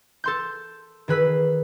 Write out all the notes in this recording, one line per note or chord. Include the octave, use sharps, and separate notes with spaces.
A4 C6 G6
D#3 G#4 B4 E6 B6